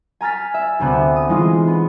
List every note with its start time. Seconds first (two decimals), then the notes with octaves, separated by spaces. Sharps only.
0.21 G#5 A#5 F6 A6 B6
0.54 E5
0.79 D2 C3 B3 F#6
1.16 D#6
1.29 E3 G#3 D#4 F4
1.68 B3